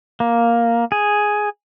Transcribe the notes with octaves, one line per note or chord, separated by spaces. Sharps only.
A#3
G#4